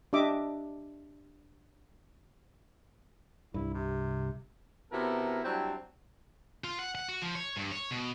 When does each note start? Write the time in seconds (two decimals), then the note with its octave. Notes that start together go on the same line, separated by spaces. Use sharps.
0.13 D4 G4 D#5 E5 D6
3.54 C2 G2 E4
3.74 C3
4.92 C3 B3 E4 F#4 A4 A#4
5.45 F#3 G3 C4 D4 E4
6.64 F4
6.79 F#5
6.95 F#5
7.08 F#4
7.22 F3
7.35 C#5
7.57 G2
7.71 C#5
7.91 B2